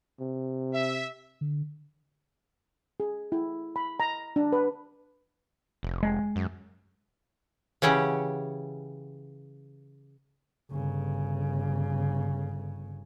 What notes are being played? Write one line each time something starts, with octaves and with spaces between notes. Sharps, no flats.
C3
E5
D3
G#4
E4
B5
A#5
D4
B4
F1
G#3
F#2
C#3 E3 C#4 G4 F#5
G1 C#3